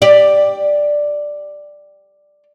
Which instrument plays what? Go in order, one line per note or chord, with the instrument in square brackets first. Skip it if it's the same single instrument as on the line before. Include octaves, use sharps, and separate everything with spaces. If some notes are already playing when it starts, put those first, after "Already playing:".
[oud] G4 D5